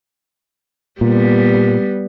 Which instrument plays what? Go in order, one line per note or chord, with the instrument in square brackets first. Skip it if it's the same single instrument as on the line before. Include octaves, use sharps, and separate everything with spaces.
[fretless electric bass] A#2 [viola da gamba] G3 B3